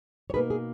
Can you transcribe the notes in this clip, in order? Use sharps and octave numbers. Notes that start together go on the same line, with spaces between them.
C#5
B2 A#3 D#4 G#4 B4
G#4